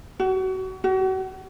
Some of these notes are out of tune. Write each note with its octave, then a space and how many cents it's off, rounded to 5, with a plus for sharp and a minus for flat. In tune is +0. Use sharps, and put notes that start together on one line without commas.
F#4 +30
F#4 +35